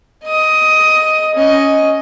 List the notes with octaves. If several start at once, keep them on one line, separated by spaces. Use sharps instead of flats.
D#5 D#6
C#4 D#5